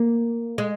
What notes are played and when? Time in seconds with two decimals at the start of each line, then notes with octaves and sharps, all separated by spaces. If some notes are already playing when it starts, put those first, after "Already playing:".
Already playing: A#3
0.58 G#3